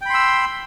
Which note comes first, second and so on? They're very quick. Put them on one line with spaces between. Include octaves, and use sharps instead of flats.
G5 B5 C6 E6